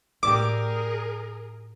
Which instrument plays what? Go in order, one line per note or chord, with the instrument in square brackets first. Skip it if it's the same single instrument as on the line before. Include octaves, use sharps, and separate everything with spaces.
[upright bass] A2 D#4 [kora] G4 D5 E5 [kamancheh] G#4 A#4 [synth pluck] D6